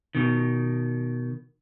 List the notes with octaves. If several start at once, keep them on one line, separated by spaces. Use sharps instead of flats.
B2 D#3